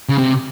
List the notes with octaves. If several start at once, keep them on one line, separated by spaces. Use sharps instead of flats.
C#3
C3